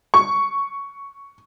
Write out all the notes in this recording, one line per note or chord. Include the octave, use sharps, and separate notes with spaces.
C#6